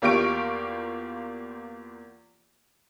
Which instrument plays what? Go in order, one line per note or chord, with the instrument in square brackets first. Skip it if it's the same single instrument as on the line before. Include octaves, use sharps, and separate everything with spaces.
[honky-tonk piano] E2 A#3 F4 G4 C#6 D7